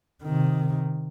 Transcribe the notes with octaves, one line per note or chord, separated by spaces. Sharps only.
C3 D#3